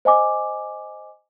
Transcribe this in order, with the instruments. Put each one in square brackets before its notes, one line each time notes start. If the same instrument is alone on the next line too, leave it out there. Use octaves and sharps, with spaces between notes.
[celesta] C5 D#5 G#5 D6